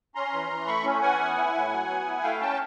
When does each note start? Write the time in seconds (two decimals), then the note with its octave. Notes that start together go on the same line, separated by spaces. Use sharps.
0.15 C#4 A#5 C6
0.32 E3
0.50 E3
0.67 A3 B5 C#6
0.84 C#4
1.02 E3 F#5 G#5
1.20 B3
1.37 E4
1.54 A2
1.71 F#3
1.89 B3
2.06 E4
2.23 A3 F5 G5
2.40 C#4 G5 A5